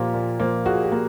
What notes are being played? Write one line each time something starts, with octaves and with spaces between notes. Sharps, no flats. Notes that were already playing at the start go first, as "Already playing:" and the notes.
Already playing: A#2 F3 A#3 G4
A#2
F3 A#3
A#2 F#4 G#4
G4
A#3